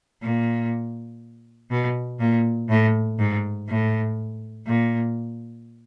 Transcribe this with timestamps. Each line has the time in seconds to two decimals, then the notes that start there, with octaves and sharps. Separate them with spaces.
0.23 A#2
1.71 B2
2.20 A#2
2.70 A2
3.19 G#2
3.69 A2
4.67 A#2